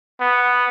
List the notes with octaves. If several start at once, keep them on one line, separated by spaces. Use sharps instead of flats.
B3